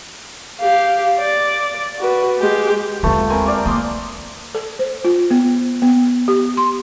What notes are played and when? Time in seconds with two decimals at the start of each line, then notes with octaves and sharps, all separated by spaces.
0.60 G4 F5
1.19 D5
1.99 F#4 B4
2.38 G#3 G4
3.03 D#2 G#3 A3 B3 F4
3.30 C4 A#4 G#5
3.45 A#3 D5 F5
3.66 A#3 F5 C6 D#6
4.55 A4
4.79 C5
5.05 F4
5.31 B3
5.82 B3
6.28 G4
6.57 C6